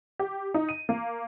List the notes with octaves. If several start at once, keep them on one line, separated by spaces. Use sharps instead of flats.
G4
D#4
D#7
A#3